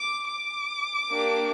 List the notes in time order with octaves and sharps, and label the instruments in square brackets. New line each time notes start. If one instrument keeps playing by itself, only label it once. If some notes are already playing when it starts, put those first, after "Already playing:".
Already playing: [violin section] D6
D6
A#3 D4 G4